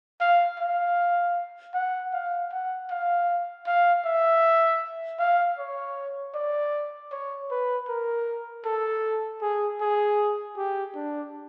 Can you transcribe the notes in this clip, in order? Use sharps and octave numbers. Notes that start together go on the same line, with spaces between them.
F5
F5
F#5
F5
F#5
F5
F5
E5
F5
C#5
D5
C#5
B4
A#4
A4
G#4
G#4
G4
D4